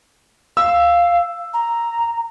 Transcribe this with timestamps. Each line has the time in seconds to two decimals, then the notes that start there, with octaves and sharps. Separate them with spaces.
0.57 F5 E6
1.54 A#5